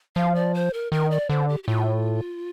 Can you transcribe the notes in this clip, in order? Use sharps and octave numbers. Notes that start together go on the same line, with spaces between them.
F3 F5
D5
C5
A#4
D#3 A#4
D5
D3 C5
G4
G4
A2 F4